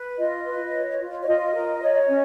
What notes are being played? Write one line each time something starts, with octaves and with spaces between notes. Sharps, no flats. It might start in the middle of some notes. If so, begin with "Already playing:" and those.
Already playing: B4
F4 D#5
B4
C#5
F4
C#5
F4 D#5
A#4
C#5
C#4